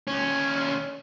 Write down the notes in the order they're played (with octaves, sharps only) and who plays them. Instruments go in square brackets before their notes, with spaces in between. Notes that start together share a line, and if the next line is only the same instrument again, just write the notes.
[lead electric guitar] D#2 C#4